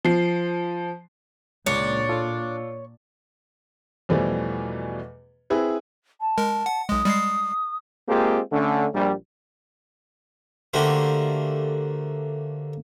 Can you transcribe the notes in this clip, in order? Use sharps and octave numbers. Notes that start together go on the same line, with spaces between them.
F3 C7
C#2 A#2 D4 C#5
F4 A4 A5
E2 B2 E3 F3 G3 A3
C4 E4 G#4 B4
A5
G#3 A#4
F#5
B1 G#3 D#6
G3 G#3 C7
G#3 A#3 C4 F4 G4 G#4
D3 A3 C#4
A#1 G3
D3 A3 A#3 F#4 G4 C5